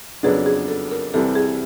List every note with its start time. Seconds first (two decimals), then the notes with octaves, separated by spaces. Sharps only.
0.23 F2 C#3 F#3 B3 D4 G#4
0.46 G#4
0.68 A4
0.91 A#4
1.14 C2 C3 E3 G3 A4
1.35 G#4